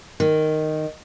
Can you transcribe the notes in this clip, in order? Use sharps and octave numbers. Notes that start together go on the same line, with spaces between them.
D#3